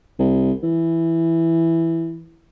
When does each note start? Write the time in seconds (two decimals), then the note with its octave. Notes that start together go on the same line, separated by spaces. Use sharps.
0.20 C2
0.64 E3